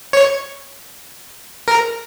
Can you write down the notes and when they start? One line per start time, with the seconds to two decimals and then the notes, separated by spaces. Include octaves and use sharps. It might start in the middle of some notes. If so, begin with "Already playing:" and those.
0.13 C#5
1.68 A#4